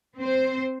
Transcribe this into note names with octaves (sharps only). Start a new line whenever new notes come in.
C4 C5